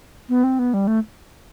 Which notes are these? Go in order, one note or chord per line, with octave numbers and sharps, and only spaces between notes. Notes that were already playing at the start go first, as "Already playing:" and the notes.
B3
C4
B3
G3
A3